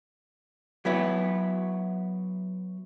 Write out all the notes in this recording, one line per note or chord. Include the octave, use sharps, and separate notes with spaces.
F#3 B3 E4